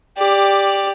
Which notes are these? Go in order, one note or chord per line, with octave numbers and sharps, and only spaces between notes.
G4 D5